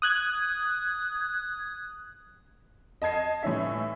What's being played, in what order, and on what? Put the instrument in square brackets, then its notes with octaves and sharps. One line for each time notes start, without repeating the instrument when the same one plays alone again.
[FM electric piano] D#6 F#6 G#6
[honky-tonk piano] D#5 A5 G#6 C7
A2 E3 C#4 D#4 E5